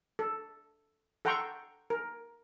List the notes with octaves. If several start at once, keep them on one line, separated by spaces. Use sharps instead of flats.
A4
A4 F#5 G5 A#5 C6 C#6
A#4